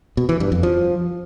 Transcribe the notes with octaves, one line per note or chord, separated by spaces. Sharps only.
B2
E3
G2
F2
F3